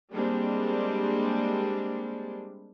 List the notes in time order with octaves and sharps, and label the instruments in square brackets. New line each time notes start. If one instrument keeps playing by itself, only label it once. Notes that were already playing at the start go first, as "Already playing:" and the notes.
[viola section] G3 G#3 A#3 C4 D4